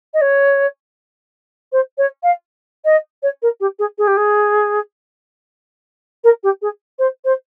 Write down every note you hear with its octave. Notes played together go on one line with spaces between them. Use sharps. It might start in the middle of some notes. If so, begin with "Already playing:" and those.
D#5
C#5
C5
C#5
F5
D#5
C#5
A#4
G4
G#4
G#4
G4
G#4
A#4
G4
G#4
C5
C5